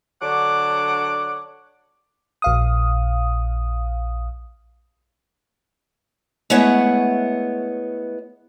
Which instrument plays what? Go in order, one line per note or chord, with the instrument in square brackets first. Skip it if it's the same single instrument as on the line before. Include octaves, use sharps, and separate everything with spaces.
[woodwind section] D3 F#3 D4 C#5 F#5 D6
[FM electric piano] A#1 F5 D#6
[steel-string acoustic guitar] G#3 A3 B3 E4 C#5 F#5